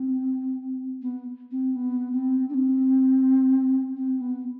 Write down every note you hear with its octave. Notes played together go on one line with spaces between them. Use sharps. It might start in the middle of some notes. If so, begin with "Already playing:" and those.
Already playing: C4
B3
C4
B3
C4
D4
C4
C4
B3